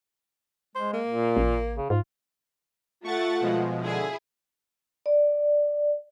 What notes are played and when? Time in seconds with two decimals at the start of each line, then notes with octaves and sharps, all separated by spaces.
0.75 G#3 C5
0.93 A#3
1.07 A#2
1.36 A1
1.76 C#3
1.90 G#2 F4
3.04 A3 F4 F#5 C#6 A6
3.40 B2 F3 G#3
3.83 D3 E4 G#4
5.06 D5